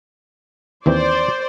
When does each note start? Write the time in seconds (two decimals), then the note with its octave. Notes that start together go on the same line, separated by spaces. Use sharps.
0.86 D#2 E3 C4 C5 D5